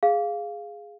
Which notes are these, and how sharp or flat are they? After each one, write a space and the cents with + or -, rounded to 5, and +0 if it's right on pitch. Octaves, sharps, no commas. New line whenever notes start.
G#4 +0 F5 +0